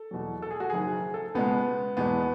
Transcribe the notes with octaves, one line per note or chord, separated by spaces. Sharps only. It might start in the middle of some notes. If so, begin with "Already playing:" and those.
Already playing: A4
E2 B2 F#3
A4
G#4
F#4
F#1 F#2 D#3 G#4
A4
C#2 B2 G#3 B3
E2 B2 G#3 B3